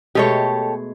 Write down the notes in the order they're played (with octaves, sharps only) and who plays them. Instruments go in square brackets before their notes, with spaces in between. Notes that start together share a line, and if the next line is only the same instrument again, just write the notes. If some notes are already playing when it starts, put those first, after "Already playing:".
[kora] B2 G#3 A3 [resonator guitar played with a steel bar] G4 A4 C#5